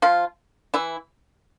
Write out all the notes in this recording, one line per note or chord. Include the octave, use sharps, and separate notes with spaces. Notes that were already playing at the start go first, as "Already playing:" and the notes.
F3 F4
E3 E4